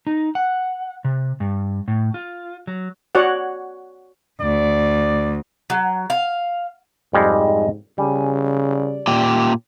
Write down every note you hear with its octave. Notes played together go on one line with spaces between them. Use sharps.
D#4
F#5
C3
G2
A2
F4
F#3
F#4 C#5 D5 F#5
D2 D5
F#3
F5
F2 G#2 G3 G#3 D#5
C#3 G3 G#5
D5
A#2 G4